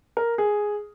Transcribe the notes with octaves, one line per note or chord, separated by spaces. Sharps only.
A#4
G#4